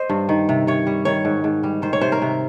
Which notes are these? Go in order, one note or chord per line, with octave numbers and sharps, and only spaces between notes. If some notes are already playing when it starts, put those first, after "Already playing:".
Already playing: C5 D#5
G2
D#3
C3
C3 C#5
G3
D#3 C#5
G#2
G#2
G3
D#3 C5
C#5
C3 C5
A#4
C3